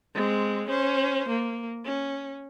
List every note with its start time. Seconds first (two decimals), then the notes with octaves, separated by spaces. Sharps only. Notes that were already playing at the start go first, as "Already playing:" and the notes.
0.14 G#3 C4
0.68 C#4 C5
1.29 A#3
1.85 C#4